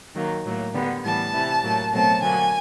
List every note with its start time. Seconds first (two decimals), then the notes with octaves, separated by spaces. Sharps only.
0.15 D#3 F#3 A#3
0.45 A2 F#3 A#3
0.74 D3 G3 B3
1.04 A2 E3 G3 B3 A5
1.34 C3 E3 G3
1.63 A2 F#3 A#3
1.93 B2 F#3 A3 C4 A5
2.22 D3 F#3 A#3 G#5